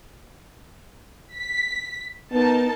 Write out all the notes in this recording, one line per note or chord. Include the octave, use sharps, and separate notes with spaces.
B6
B3 D#4 A#4 A5